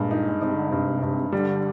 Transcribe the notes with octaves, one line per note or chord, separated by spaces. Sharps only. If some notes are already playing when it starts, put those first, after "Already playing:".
Already playing: G2 A#2 G#3
D#4
C3 D#4
D3
G2 C3
G2
D3 G3